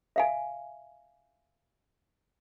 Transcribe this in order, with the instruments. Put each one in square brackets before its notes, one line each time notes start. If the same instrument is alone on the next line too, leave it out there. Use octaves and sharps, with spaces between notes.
[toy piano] E5 F5 G#5